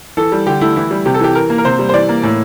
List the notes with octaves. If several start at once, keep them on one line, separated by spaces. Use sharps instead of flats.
E3 A4
G3
D3 G4
A3 E4
E3 E4
G3
C3 G4
A4
E3 G4
E3 A#4
A#3
A#4
C3 C5
G3
C5
E3 D5
A#3
A2